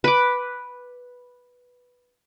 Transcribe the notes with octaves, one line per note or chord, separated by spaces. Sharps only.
B4 D6